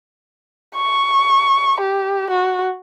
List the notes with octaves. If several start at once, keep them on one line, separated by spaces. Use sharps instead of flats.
C#6
G4
F#4